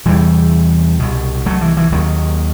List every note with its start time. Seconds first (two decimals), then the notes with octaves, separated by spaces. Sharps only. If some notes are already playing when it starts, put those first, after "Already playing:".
0.05 E2 C3 E3 G3
0.99 C2 B2
1.46 F#3 A3
1.61 E3
1.77 E3
1.92 D#2 D#3 F#3